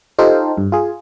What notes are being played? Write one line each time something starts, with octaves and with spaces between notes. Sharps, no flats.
D#4 F4 G4 A4 C5 F5
G2
F4 G#4